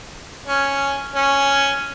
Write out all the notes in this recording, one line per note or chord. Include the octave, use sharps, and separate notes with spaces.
C#4
C#4